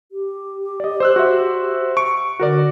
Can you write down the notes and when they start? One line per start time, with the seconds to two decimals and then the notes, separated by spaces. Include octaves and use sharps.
0.12 G4
0.80 D5 D#5
1.00 C5 E6 F#6
1.16 F#4 C5 E5
1.97 C#6 D7
2.40 D3 F#4 A#4 D5